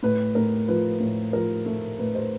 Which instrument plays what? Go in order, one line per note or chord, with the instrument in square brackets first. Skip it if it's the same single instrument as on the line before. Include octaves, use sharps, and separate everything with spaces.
[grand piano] A2 B4
A2 A#4
F3 B4
A2
F3 A#4
A3
A2 B4
C5